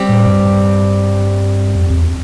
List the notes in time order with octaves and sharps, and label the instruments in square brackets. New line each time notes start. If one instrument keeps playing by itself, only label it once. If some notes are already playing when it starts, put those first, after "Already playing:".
Already playing: [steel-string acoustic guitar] G3 C4 G4
[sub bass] A2
G2
F2
E2